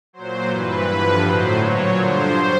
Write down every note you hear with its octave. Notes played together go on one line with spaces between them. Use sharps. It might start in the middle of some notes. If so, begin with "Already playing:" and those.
A#2 F#3 C5
G2 E3 B4
G2 D3 F3
A2 F#3 C5
A#2 F#3 C#5
G2 D3 F3 C5